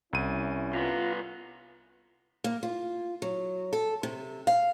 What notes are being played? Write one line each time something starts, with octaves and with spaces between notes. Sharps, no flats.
C2 C#4 E4 D#7
G2 B3 F4 A#5
A#3
F4
F#3
A4
C3
F5